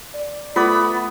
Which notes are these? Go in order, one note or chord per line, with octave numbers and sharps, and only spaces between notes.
D5
A3 B3 F4 B5 D6